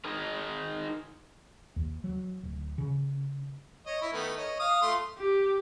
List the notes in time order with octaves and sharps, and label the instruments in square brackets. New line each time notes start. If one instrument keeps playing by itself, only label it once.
[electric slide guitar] D#4 G#4 A#4
[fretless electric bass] D#2
F#3
D1
C#3
[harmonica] C#5 D#5
E4
D#3 A3 B3
C#5 D#5
F5 D#6
A3 F4 C6
[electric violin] G4